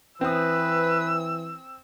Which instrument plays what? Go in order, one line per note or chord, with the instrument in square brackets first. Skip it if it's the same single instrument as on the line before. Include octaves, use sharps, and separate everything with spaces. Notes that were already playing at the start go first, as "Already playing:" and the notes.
[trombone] E3 [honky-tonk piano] C4 D#6 [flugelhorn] B4 [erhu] E6